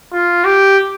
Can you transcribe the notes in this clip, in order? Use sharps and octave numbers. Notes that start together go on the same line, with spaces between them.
F4
G4